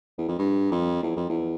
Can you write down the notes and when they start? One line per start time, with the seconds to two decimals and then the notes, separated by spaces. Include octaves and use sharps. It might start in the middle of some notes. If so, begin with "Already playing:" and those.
0.18 E2
0.28 F2
0.38 G2
0.72 F2
1.03 E2
1.17 F2
1.29 E2